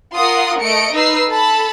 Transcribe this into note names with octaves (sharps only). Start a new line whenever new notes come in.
F4 A#4 F#5 C6 D#6
A3 D#5 C#7 D7
D#4 B4 E6 C7
A4 A5 B5